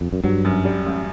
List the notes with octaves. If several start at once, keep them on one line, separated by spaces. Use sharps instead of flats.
F2
F#2
G2 F#3
F#2
G3
A1